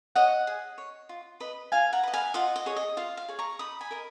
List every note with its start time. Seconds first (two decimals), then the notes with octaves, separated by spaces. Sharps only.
0.15 C#5 D#5 F#5
0.47 G#4
0.78 C#5
1.09 F4
1.40 B4 D#5
1.72 F4 F5 G#5
1.93 F#5 A#5
2.03 B4 D#5
2.14 F5 G#5
2.34 F4 D#5 F#5
2.56 D#5
2.66 G#4 C#5
2.76 D#5
2.97 F4 F5
3.17 F5
3.29 G#4 C#5
3.39 A#5 C#6
3.59 D#4 B5 D#6
3.81 G#5 B5
3.91 A#4 D#5